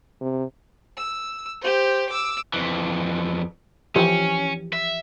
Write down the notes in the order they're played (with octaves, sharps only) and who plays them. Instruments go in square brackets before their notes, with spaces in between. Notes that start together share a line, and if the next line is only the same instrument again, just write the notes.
[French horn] C3
[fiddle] E6
G4 C5
D6 E6
[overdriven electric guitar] F2 E3
[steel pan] E3 F3 G4 [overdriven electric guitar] C#4
[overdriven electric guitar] E5